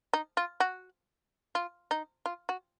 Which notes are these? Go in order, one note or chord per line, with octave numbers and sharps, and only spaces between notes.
D#4
F4
F#4
F4
D#4
F4
F#4